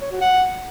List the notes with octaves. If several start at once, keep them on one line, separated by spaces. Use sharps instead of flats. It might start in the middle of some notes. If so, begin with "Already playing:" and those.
C#5
F#4
F#5